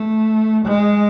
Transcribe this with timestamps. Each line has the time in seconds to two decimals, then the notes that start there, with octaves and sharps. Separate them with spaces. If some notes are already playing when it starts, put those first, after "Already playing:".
Already playing: A3
0.65 G#3